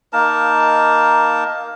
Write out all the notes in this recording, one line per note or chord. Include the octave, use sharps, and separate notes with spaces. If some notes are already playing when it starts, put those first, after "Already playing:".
A#3 D#4 A#4 A5